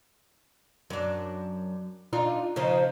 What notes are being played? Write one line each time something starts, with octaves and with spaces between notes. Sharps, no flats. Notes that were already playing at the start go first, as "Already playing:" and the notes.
F#2 D4
D4 D#4 F4
C#3 F3 D#4